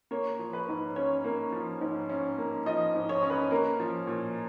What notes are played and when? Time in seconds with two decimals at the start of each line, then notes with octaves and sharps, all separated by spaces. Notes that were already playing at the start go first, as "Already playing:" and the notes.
0.11 A#3 C#5
0.39 F3
0.53 B4
0.68 G#2
0.96 C#4 C#5
1.24 A#3
1.53 F3
1.81 G#2
2.09 C#4
2.38 A#3
2.66 F3 D#5
2.95 G#2
3.09 C#5
3.23 C#4
3.30 B4
3.51 A#3 A#4
3.80 F3
4.07 A#2